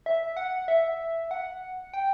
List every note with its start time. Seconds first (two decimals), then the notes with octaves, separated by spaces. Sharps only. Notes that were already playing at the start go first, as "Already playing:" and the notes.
0.06 E5
0.37 F#5
0.68 E5
1.31 F#5
1.93 G5